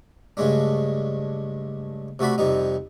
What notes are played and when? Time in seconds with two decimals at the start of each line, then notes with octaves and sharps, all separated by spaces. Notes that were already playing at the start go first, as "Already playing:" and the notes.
0.37 G2 C#3 G#3 A3 D4
2.19 C3 A3 F#4 D5 B5
2.38 F2 C3 G3 D#4